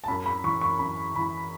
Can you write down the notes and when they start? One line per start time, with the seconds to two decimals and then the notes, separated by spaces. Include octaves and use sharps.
0.04 A5
0.08 F#2 B5
0.26 B5
0.44 E3 C#6
0.61 C#6
0.79 F#2 B5
1.15 E3 B5